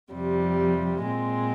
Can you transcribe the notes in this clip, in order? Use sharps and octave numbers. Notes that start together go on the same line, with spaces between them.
F2 C3 G3
A#2 G#3 C4